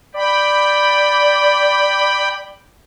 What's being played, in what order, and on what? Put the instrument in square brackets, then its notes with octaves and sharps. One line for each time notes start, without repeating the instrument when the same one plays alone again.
[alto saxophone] D5 [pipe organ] G5 B5